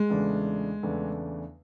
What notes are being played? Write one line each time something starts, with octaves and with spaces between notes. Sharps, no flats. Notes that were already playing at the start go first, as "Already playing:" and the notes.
Already playing: G#3
E2 C#3 E3 A3 D4
E2 C#3 E3 A3 D4